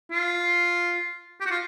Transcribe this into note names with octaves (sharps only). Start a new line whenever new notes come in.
F4
G4
F#4
F4